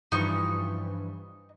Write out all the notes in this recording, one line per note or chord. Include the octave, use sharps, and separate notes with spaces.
G2 E3 F3 D#4 C#6